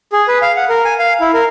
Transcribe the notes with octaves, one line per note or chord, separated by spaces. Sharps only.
G#4
B4
F5
F#5
A#4
G#5
F5
E4
A#4